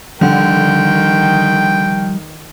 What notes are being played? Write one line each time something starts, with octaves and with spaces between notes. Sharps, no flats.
D3 D#3 F3 G3 F#5 G5